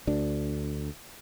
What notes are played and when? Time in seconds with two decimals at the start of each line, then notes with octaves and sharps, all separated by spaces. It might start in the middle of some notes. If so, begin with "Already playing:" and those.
0.07 D2 D4